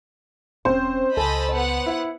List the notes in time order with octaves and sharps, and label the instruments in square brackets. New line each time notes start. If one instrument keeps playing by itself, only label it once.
[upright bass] E1 [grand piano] C4 C#4 [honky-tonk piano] C5
[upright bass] C#2 [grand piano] A4 G#5 [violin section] D#5 A5 B5
[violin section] B3 F#5
[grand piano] E4 E5